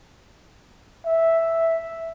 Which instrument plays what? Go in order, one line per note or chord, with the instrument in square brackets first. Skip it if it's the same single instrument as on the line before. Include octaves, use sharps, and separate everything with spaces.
[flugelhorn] E5